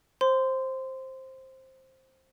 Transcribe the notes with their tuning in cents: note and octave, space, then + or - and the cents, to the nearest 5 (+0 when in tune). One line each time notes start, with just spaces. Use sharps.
C5 +10 C6 -20